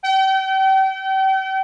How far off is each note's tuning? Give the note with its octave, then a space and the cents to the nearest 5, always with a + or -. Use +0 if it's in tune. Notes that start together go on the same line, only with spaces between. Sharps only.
G5 -35